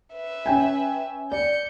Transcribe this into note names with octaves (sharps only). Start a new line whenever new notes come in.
B4 E5
C#4 G5 G#5
D5 G6 C#7